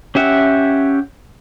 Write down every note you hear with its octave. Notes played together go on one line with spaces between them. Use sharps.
C#4 G4 E5 F#5